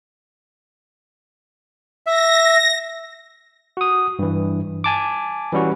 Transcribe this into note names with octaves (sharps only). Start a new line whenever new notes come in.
E5 A#6
F#4 D#6
G2 E3
G#5 A5 D6
E3 G3 C#4 F#4